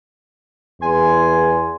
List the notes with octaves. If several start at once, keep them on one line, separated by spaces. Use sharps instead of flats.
E2 G#5 C6